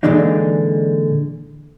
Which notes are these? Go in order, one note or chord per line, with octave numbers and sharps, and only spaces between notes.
A#2 D3 E3 G#3 D4 D#4